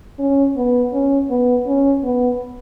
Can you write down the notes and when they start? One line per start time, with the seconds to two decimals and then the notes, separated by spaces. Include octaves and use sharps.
0.19 C#4
0.57 B3
0.93 C#4
1.30 B3
1.67 C#4
2.04 B3